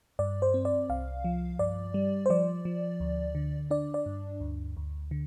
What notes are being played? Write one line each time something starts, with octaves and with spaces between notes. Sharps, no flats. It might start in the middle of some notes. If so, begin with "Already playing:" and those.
G2 D5
C5
C4
D5
C2 F5
F3
G2 D5
G3
C5
F3 D5
F3
D2
D3
D4 D5
D5
G2
D2
D2
D3